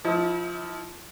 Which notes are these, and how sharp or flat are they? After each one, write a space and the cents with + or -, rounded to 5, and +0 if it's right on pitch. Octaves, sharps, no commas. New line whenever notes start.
F3 +0 E4 -35 D#5 +45